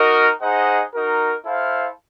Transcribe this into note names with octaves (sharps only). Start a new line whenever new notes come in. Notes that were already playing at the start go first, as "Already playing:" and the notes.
Already playing: D#4 F#4 A#4 D#5
D#4 G#4 C5 D#5 F#5
D#4 F#4 A#4
E4 A4 C5 F5